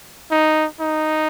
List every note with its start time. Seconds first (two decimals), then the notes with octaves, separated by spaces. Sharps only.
0.31 D#4
0.80 D#4